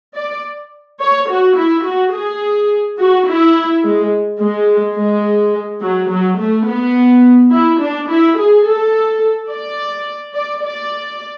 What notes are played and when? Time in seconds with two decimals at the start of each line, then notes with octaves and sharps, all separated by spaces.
0.15 D5
1.00 C#5
1.29 F#4
1.56 E4
1.84 F#4
2.13 G#4
2.99 F#4
3.27 E4
3.84 G#3
4.40 G#3
4.96 G#3
5.81 F#3
6.09 F#3
6.38 A3
6.67 B3
7.52 E4
7.80 D4
8.09 E4
8.37 G#4
8.66 A4
9.51 D5
10.34 D5
10.63 D5